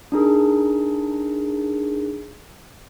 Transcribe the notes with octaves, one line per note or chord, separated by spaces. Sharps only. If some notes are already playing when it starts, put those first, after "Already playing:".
D4 D#4 G#4 A#4